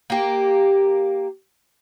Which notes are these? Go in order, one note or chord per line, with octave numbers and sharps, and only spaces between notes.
A#3 G4